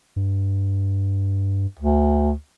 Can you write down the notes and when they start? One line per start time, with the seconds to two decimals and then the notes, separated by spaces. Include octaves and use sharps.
0.16 G2
1.79 D2